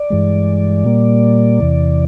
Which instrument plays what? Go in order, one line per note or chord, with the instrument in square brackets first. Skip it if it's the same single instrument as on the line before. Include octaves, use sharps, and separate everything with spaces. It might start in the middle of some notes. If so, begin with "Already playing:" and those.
Already playing: [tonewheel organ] D5
G2 E3 G#3
A#2 G3 A#3
E2 C3 E3